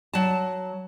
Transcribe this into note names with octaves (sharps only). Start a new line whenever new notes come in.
F#3 A5